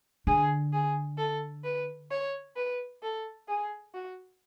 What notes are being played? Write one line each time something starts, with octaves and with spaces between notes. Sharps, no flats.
D3 G#4
G#4
A4
B4
C#5
B4
A4
G#4
F#4